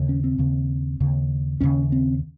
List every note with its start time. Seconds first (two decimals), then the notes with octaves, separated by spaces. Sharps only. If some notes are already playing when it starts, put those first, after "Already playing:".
Already playing: D#2 C#3
0.09 C#4
0.24 C4
0.38 D#2 C#3
1.00 D#2 C#3
1.60 D#2 C#3 C#4
1.92 C4